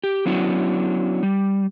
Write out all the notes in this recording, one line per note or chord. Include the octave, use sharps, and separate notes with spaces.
G4
F#3 B3 C#4 D4 E4 F#4
G3